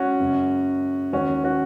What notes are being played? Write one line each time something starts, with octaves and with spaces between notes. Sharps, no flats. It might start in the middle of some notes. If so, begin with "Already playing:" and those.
Already playing: C#4 F#4
F#1 F#2 C#3
D#2 D#3 C#4 F#4
C#4 F#4